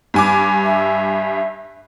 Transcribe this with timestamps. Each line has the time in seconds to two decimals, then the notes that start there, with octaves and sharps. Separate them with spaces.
0.14 G2 G#5 D6
0.64 E5